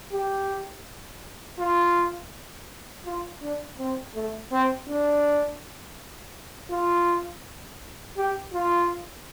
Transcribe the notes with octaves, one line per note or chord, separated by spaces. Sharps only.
G4
F4
F4
D4
C4
A3
C4
D4
F4
G4
F4